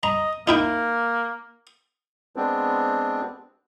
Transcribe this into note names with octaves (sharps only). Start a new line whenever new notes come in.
D#5 A#5
A#3 D#4 E4 G5
G#3 B3 C4 D4